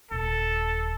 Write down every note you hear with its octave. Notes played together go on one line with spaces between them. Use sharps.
D#1 A4